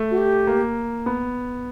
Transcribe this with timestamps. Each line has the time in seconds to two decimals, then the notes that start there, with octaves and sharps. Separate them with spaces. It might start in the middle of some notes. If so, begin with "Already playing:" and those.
Already playing: A3
0.11 F#4
0.18 G4
0.47 A#3
1.06 B3